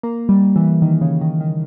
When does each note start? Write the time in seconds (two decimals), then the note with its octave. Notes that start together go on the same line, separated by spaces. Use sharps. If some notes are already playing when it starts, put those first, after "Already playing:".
0.03 A#3
0.29 G3
0.56 E3
0.82 D#3
1.01 C#3
1.21 D#3
1.41 D#3